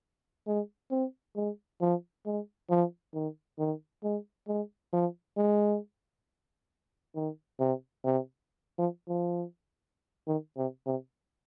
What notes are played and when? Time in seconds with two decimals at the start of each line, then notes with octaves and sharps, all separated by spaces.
0.47 G#3
0.91 C4
1.36 G#3
1.81 F3
2.26 G#3
2.70 F3
3.14 D#3
3.59 D#3
4.04 G#3
4.48 G#3
4.93 F3
5.37 G#3
7.16 D#3
7.60 C3
8.05 C3
8.79 F3
9.09 F3
10.28 D#3
10.57 C3
10.87 C3